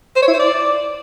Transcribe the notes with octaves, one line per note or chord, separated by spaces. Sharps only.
C5
C#5
E4
C5
D5